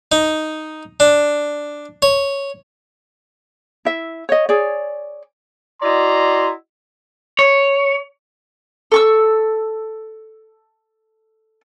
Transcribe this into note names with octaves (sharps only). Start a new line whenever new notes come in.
D#4
D4
C#5
E4 E5
C#5 D#5
G#4 C#5 D5
E4 F#4 D5 D#5 A#5 C6
C#5
A4 C#6 E6